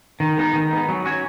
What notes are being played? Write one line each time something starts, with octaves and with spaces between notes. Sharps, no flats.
D#3
G#3 B3 D#4
D#3
G#3 B3 D#4
F#3
C#4 F#4 C#5